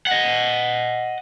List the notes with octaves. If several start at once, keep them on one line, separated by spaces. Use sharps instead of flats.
D#5 F#5